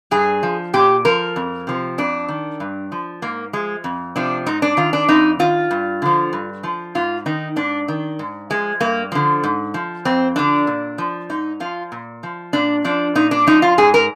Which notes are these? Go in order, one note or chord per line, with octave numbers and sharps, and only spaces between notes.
G2 G#4
F3
A#2 G4
F3 A#4
F2
C3 F3
F2 D4
D#3
G2
F3
G#2 A#3
F3 G#3
F2
C3 F3 D4
G#2 D#4
D4
D#3 F4
D4
F2 D#4
D#3 F4
G2
D3 F3
G2
F3
G#2 F4
D#3 D#4
G#2 D4
D#3
G#2
F3 G#3
G2 A#3
D3 F3
G#2
F3
F2 C4
D3 F3 D4
A#2
F3
G#2 D#4
F3 F4
A#2
F3
A#2 D4
F3 D4
A#2 D#4
D4
F3 D#4
F4
G#2 G#4
A#4